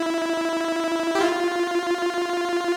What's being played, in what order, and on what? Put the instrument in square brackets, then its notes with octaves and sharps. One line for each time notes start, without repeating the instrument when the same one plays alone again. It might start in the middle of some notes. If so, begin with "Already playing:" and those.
Already playing: [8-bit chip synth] E4
G4
F4